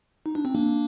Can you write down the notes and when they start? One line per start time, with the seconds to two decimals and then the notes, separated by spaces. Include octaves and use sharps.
0.26 D#4
0.35 D4
0.45 C4
0.55 A#3 D4